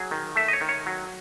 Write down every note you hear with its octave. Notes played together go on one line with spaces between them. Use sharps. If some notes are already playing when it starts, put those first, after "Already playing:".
Already playing: F#3 G#4
D#3
A3 E5
D#5
C#5
D#3
C#5
F#3